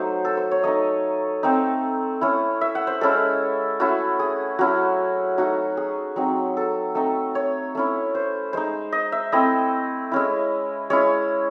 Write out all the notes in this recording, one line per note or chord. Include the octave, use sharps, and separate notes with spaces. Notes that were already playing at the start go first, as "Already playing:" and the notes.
Already playing: F#3 A3 D#4 C5
A4
C5
C#5
A3 D#4 D#5
A3 C4 D#4
A3 C#4 E4
E5
F#5
C5
G#3 C#4 E4 A4
A3 C#4 E4 F#4
G#4
F#3 C#4 E4 F#4
A3 D#4 F#4
G#4
F#3 C4 D#4
A4
A3 C4 D#4
C#5
A3 C#4 E4
C5
G#3 D#4 C5
D#5
E5
A3 C4 E4 D#5
G#3 C#4 E4
G#3 C#4 E4 C#5